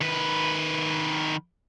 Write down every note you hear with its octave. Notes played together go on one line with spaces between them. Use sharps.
D#3 B4